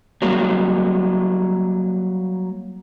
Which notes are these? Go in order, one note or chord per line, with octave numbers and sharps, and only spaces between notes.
F#3 G3 A#3